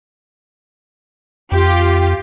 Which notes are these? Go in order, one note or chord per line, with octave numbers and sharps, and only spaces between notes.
F2 F4 G4